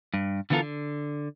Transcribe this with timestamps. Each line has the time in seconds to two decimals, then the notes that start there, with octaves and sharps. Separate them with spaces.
0.14 G2
0.50 D3 E3 B3 F4 A4 A#4
0.62 D3